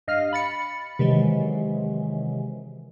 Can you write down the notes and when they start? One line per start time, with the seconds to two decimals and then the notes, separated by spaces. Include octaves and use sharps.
0.08 G2 D#5 F5 F6
0.33 B5 A6 C#7
0.99 C3 D#3 E3 F#3 G#3